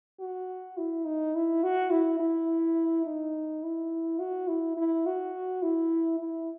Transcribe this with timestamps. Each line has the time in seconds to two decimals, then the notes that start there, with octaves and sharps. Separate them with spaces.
0.20 F#4
0.78 E4
1.05 D#4
1.35 E4
1.63 F#4
1.91 E4
2.20 E4
3.06 D#4
3.63 E4
4.19 F#4
4.48 E4
4.77 E4
5.06 F#4
5.63 E4
6.20 E4